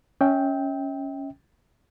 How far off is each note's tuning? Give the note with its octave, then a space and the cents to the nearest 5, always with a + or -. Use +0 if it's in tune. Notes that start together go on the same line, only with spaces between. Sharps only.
C#4 +0 E5 -35 G5 +0